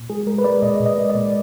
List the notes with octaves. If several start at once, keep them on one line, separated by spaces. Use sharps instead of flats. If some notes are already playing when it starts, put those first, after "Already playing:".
Already playing: A#2
G#3 G#4
G#3 A#4
B4
G#3 D5
A#2 D#5
A#2
D#5
G#3
D5
A#2